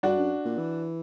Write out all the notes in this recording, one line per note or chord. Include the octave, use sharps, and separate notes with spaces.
G2 D4 F#4
F#2
A#2
E3